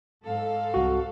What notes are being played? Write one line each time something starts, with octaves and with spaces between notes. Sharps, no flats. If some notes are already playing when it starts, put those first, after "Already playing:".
G#2 A4 F5
C2 F#4